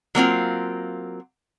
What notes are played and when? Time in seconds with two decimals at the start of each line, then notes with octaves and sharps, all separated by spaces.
0.15 F#3 A#3 C4 F4